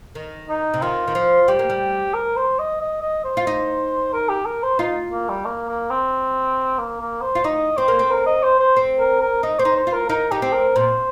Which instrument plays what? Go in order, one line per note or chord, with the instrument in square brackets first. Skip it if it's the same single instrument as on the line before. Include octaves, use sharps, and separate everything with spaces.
[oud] D#3
[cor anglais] D#4
[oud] C3
[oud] D#3 [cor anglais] F4
[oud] D#3
F3
[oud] G3 [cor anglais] G4
[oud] A#3
G3
[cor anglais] A#4
C5
D#5
D#5
D#5
C5
[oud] F4
D#4
[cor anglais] A#4
G4
A#4
C5
[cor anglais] D#4 [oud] F4
[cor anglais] A#3
G3
A#3
A#3
C4
A#3
A#3
C5
[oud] F4
[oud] D#4 [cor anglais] D#5
[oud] C4 [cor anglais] C5
[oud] A#3
C4
[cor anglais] A#4
D#5
C5
C5
[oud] C4
[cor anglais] A#4
A#4
[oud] D#4 [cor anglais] D#5
[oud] C4 [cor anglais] C5
[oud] D#4
[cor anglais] C5
[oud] F4
[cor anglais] A#4
[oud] D#4 [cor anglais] A#4
[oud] D#4 [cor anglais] G4
[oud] C4
[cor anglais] A#4
[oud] A#2 [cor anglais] C5